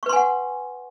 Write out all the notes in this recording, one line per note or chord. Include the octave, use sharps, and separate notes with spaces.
B4 F#5 G#5 C6 C#6